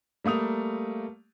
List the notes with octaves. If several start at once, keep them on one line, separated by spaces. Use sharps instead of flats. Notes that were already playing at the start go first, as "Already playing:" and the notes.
G3 A3 A#3 D#6 F7